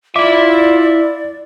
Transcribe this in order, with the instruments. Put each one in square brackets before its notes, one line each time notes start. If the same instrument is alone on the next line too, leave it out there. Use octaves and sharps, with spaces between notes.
[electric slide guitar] E4 E5 [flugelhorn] F4 [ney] D5 [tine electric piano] D6